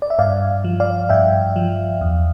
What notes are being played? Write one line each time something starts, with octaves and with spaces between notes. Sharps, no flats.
D5
E5
G2 D5 F5
F3
D5 F5
G2 E5 G5
F3
E2